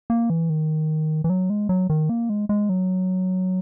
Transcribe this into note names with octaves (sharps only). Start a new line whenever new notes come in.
A#3
E3
D#3
E3
F#3
G#3
F#3
D#3
A#3
G#3
G#3
F#3